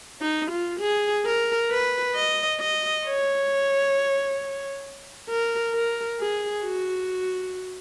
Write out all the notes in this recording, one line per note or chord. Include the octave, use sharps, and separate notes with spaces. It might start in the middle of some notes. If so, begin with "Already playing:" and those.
D#4
F4
G#4
A#4
B4
D#5
D#5
C#5
A#4
A#4
G#4
F#4